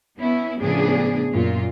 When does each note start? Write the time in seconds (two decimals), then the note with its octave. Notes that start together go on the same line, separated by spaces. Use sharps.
0.17 B3 C#4 E4
0.60 A2 C#3 F3 B3 D4 G#4
1.33 F#2 A#2 F4